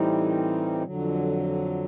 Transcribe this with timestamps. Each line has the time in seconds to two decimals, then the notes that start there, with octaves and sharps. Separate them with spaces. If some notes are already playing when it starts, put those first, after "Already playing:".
Already playing: A2 E3 G3 C4 D#4
0.83 F2 D3 F#3